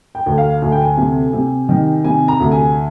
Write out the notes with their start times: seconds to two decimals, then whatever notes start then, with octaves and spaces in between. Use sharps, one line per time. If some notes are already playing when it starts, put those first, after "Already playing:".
0.15 G5
0.26 D2
0.38 F5
0.62 D2 G#5
0.72 G5
0.82 G#5
0.97 C3
1.33 C3
1.69 D#3
2.04 C3 G#5
2.28 A#5
2.40 D2
2.52 G#5